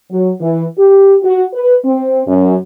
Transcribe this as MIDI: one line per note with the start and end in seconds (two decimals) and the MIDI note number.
0.11 0.30 54
0.41 0.63 52
0.78 1.16 67
1.23 1.43 66
1.53 1.75 71
1.84 2.21 60
2.27 2.55 42